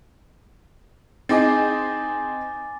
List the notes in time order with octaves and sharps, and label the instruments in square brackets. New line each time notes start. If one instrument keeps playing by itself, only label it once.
[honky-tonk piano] C4 D#4 G#4 [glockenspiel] G#5 D6 A6